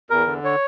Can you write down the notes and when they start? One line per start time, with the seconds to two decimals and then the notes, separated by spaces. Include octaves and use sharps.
0.10 E2 A#4
0.27 D3
0.44 C#5